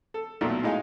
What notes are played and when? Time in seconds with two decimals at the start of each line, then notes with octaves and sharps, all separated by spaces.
0.14 A4
0.41 B1 A#2 A3
0.63 A2 G#3 D#4 F5 G#5